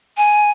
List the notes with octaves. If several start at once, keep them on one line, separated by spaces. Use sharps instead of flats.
G#5